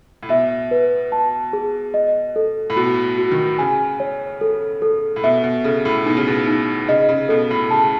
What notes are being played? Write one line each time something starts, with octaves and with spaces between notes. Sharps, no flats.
A2
B2 E5
B4
A5
G#4
D#5
A4
A2
B2 F#4
F#4
D#3
C#3 G#5
C#5
A4
A4
A2
B2 E5
B2
C#3 A4
A2
B2 D#4
C#3
B2
D#4
C#3 D#5
C#3
B2 A4
A2
C#3 A5